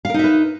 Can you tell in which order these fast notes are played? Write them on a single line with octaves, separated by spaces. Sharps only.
F5 A#4 D#4 E5 B4